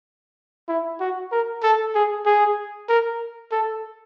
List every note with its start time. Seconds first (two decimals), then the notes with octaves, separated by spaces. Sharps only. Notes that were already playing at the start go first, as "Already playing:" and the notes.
0.68 E4
1.00 F#4
1.32 A#4
1.63 A4
1.95 G#4
2.26 G#4
2.89 A#4
3.52 A4